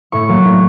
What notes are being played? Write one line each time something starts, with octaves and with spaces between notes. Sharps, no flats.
A2 C#6
F#3 A#3
A2